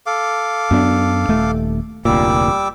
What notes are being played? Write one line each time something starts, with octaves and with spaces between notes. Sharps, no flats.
A4 F5 D6
F#2 B3 D4
D#1 A3
F1 D2 A#2 G3 D6 E6